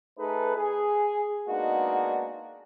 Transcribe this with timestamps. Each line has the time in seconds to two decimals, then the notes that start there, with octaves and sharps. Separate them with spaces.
0.19 A3 D#4 G#4 A4 B4
0.56 G#4
1.49 G#3 A#3 B3 D4 D#4 F#4